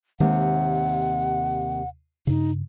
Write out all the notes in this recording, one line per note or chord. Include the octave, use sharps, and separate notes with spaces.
D#2 C3 D#3 G#3 A#3 F#5
G2 C#3 D#4